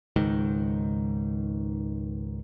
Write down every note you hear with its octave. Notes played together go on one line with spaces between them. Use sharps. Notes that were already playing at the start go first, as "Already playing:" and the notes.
C#2 G#2 D#3